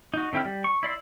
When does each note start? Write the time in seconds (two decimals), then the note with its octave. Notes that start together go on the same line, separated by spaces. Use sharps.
0.14 D#4 F#4
0.33 D3 C4 E4 G5 F6
0.45 G3
0.64 C#6
0.83 E4 D5 C6 E6